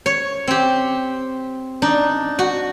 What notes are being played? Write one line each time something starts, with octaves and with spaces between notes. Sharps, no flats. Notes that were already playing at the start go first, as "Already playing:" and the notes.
C#5
C4 G4
D4 D#4
F#4